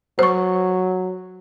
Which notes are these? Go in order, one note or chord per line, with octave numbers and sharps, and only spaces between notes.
F#3 C5 C#6